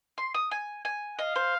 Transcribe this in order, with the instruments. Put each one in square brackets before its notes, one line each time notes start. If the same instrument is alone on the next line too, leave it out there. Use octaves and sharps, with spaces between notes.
[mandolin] C6
D#6
G#5
G#5
[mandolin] D#5 [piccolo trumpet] F5
[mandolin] C5